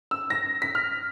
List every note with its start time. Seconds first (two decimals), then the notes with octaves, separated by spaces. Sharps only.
0.11 E6
0.30 A#6
0.62 B6
0.75 F6